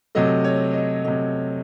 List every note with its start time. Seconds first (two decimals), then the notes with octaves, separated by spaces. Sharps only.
0.15 C3 F#3 A3 D#5
0.44 C#5
0.73 D#5
1.04 C3 F#3 A3 D#5